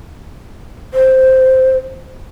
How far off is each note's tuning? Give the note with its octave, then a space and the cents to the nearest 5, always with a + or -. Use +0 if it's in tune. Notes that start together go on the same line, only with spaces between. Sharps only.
C5 -5